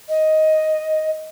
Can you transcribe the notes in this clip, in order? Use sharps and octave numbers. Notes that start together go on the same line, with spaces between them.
D#5